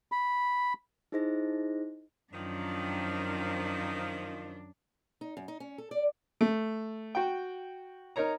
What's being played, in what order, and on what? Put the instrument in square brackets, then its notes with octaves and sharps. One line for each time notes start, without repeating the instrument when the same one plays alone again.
[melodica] B5
[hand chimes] D#4 E4 G#4 C5 D#5 A#6
[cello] F#2 D4 [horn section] D#3 F3
[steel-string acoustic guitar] D#4
F#2
D#4
C#4
A4
D5
[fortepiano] A3
F#4 G5
D#4 A#4 C#5 A#5